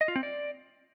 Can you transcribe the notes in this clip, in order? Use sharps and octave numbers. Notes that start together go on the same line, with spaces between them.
D#5
F4
C4
D5